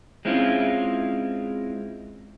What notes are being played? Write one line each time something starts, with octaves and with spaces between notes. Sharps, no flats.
G#3 C4 C#4 E4 F4